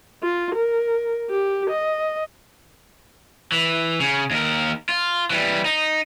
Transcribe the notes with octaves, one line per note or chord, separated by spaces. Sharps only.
F4
A#4
G4
D#5
E3
C#3
D#2 A#4
F4
E3 G3
D#4